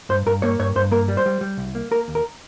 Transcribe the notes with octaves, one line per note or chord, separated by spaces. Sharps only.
G2 C5
G2 A#4
A#3 C#5
G2 C#5
G2 C5
A#3 A#4
G3
C5
G3
G3
C2
A#3
A#3 A#4
D#2
A#4